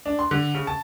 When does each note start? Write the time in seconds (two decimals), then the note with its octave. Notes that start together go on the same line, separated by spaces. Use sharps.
0.06 D4
0.19 C6
0.31 D3
0.55 C#3
0.67 A5